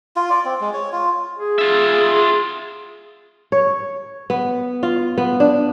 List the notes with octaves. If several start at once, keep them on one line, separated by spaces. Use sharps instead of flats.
F4
D5
C4
G#3
C#5
F4
G#4
F4 E5
C#5
B3
F4
B3
D4